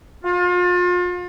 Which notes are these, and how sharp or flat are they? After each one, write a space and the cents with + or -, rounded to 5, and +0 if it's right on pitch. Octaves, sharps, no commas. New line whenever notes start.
F4 +35